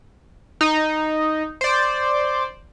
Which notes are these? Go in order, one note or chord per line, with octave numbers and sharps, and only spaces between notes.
D#4
C5 D5